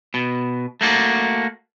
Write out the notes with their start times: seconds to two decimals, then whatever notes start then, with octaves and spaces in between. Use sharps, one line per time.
0.14 B2
0.81 A3 A#3 F#4 D5